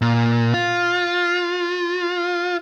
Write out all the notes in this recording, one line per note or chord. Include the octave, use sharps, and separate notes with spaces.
A#2
F4